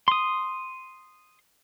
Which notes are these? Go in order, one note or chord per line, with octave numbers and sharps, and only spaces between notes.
C6 D#6